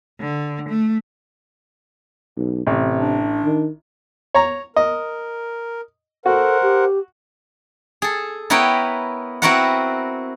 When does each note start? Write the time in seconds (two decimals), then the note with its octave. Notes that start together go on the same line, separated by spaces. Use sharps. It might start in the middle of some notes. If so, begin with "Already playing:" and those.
0.20 D3
0.69 A3
2.37 B1
2.67 A1 C3
2.98 D4
3.44 D#3
4.35 C#5 A#5
4.76 A#4 D#5
6.26 F#4 A4 A#4 C5 F#5
6.63 G4
8.02 G#4 A4
8.50 B3 E4 A#4 B4 C#5 G5
9.42 C4 E4 F#4 A#4 B4 F#5